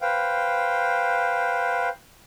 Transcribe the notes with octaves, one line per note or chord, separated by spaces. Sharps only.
B4 C5 F5 G5